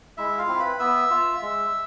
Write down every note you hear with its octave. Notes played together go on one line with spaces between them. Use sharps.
G#3 E4 E5
F4 F5
C4 E4
B4 B5
B3 E5 E6
F4
G#3